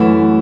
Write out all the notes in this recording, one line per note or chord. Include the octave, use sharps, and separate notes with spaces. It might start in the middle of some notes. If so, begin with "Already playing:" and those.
Already playing: F#2 E3 A3